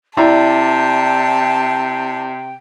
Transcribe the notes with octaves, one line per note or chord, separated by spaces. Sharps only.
C3 E4 D5 G5 A5 A#5